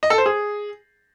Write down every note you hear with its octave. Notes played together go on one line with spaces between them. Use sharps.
D#5
A4
C5
G#4